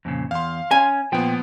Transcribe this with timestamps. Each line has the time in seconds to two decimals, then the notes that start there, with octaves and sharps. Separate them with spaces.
0.05 F2 A#2 C#3
0.31 E2 F5 C6
0.71 C#4 G#5
1.12 A#2 F3 B3 G5